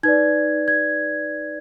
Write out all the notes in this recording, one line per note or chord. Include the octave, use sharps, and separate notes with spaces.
D#4 B4 D5 G#6
G#6